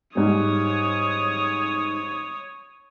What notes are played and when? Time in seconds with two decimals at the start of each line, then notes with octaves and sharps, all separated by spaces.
0.15 G#2 G3 C#5 D#6